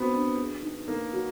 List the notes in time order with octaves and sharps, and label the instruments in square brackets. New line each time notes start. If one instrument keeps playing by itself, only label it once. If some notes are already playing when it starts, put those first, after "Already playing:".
Already playing: [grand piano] B3 C4 [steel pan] F#4
[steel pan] D4
G#4
D#4
[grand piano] A#3 [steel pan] D#4
[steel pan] F#4